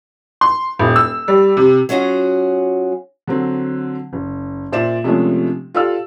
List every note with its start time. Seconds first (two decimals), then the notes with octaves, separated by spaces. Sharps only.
0.41 C6
0.79 D#1
0.96 E6
1.28 G3
1.57 C3
1.89 F#3 C#4 F4 F#4 G#4
3.27 D3 F#3 C4
4.13 F#1
4.72 A#2 C5 D5 E5 E7
5.04 C3 F3 G#3 A3 C#4 D4
5.74 F4 G4 A4 D5 F5 E6